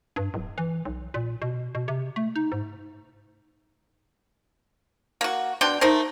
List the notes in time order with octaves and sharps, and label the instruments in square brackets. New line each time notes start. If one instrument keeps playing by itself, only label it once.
[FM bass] G2
D1
E3
B1
A#2
B2
B2
C3
A3
D#4
G#2
[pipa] A#3 F#4
B2 D4 G5 C6
A3 D#4 A#4 C5